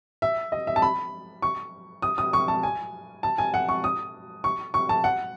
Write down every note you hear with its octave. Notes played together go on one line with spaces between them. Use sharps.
E5
D#5
E5
A5
B5
C#6
D#6
D#6
C#6
A5
G#5
A5
G#5
F#5
C#6
D#6
C#6
C#6
A5
F#5